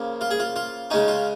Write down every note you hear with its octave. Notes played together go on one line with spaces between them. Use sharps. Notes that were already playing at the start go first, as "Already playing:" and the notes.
Already playing: C#3 F3 A#3
F4
G#4
F4
F4
C#3 G#3 C#4 D#4
F4